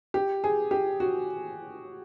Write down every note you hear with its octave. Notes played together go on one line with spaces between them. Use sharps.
G4
G#4
G4
F#4